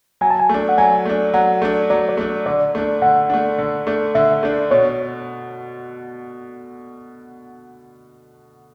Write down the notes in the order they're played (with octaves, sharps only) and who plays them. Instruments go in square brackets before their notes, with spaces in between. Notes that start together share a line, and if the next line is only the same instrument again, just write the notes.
[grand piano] F#3 [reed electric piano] G#5
[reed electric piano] A5
G#5
[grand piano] A3 D4
[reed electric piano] F#5
[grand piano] F#3 [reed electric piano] G#5
[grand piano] A3 D4
[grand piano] F#3 [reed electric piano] F#5
[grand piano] A3 D4
[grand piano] F#3 [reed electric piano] D5
[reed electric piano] D5
[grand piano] A3 D4
[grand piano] D3 [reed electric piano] D5
[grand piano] A3 D4
[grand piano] D3 [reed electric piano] F#5
[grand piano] A3 D4
D3
A3 D4
[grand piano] D3 [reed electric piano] E5
[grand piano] A3 D4
[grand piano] B2 [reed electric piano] C#5